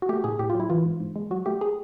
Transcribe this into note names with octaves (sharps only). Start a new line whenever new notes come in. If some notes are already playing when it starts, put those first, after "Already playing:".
F#4
A3 G4
A2 G#4
A2 G4
F4
F#3
E4
E3 F4
G#2
G#2
G#3
F#3 F#4
A3 G4
G#4